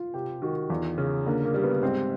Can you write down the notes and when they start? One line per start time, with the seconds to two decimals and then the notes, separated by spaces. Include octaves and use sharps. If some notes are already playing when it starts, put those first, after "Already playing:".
Already playing: F4
0.14 C3 G4
0.42 D#3 F#4
0.70 E2 F4
0.98 C#3
1.26 D3 A#3
1.45 A#3
1.54 G3
1.64 B3
1.82 G#2 C4